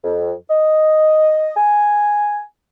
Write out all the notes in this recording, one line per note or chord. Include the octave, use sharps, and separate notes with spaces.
F2
D#5
G#5